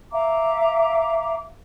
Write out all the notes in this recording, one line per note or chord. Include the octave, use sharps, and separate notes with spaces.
E5 F5 A#5 D6